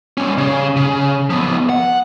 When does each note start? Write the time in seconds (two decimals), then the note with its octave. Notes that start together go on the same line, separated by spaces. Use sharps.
0.18 G3 C#4
0.38 C#3 C#4
0.76 C#3
1.30 F3 B3
1.69 F#5